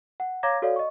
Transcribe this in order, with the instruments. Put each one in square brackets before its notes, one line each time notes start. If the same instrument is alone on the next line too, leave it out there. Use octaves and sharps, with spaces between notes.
[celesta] F#5
C#5 F5 A#5 D6 G#6 A#6
F#4 A4 C#5 D5 F5
D#5 C#6